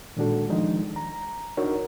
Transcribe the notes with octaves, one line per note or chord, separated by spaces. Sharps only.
A#2 D#3 G#3 D4 F#4 A4
D#3 F3 G#3 D4 D#4
A#5
D4 D#4 F#4 A#4 C#5